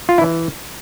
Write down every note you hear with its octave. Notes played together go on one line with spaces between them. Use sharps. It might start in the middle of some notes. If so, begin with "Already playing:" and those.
F4
E4
E3